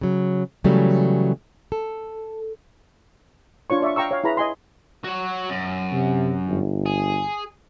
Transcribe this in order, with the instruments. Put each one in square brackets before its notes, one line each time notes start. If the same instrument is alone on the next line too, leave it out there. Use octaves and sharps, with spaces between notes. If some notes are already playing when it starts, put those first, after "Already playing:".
[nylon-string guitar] C#3 F#3
C#3 E3 F#3 G3 A3
A4
[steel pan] D4 F4 C#5 C#6
D5 E5 F5 C#6
F5 G5 A#5 C#6 E6
C#5 F5
E4 G#4 B4 A#5 B5
D#5 G#5 C6
[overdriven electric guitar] F#3 F#4
F#2
[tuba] C3
G1
[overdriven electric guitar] G#4